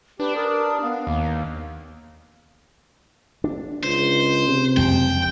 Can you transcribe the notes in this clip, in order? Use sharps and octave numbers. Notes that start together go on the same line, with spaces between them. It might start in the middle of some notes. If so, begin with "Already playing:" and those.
D4 G4 B4
A#4 D#6
B3 F5
D#2 A#3
D4
C#2 C5
C3
F#1 F2 G#3 G5